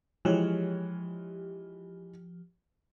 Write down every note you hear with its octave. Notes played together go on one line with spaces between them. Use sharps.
E3 F3 G#3 G4 C#5